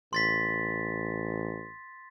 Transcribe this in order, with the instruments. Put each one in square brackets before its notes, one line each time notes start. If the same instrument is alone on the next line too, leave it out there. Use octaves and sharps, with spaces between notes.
[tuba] A1 [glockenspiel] C6 A6 B6